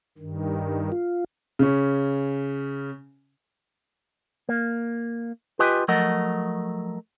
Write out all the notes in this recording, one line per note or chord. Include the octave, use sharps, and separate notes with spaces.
G2 D#3
F4
C#3 C#4
A#3
F4 G4 B4 D#5 G5 G#5
F3 F#3 A3 A#4 D#5 F#5